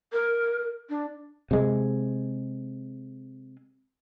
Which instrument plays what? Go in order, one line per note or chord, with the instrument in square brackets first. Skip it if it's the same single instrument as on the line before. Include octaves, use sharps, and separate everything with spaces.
[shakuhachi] A#4
D4
[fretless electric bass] C3 G#3